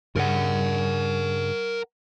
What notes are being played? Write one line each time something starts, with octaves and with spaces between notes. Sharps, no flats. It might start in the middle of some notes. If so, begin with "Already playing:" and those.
G2 C#3 A#4 F#5